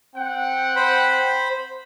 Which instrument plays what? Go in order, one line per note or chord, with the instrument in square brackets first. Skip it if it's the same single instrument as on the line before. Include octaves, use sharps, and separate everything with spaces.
[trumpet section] C4 F#5 G5
[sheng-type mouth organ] C5 B5